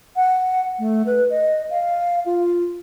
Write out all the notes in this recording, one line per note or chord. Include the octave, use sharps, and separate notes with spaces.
F#5
A3
B4
D#5
F5
F4